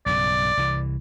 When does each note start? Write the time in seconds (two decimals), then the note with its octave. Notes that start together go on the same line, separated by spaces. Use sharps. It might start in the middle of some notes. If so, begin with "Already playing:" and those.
0.06 B1 G2 C#3 D5
0.57 C2 E3